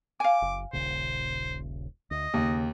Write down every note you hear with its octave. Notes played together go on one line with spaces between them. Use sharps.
F5 G#5 D6
F#1
D#1 A#1 C#3 C5
D2 D#5
D#2 C#3